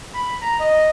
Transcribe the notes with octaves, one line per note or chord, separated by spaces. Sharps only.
B5
A#5
D#5